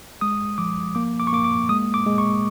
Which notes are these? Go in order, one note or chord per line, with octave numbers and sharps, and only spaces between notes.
G#3 D#6
F3 D6
A#3 D6
D6
C#6
A#3 D6
D6
G#3 D#6
D6
G#3
C#6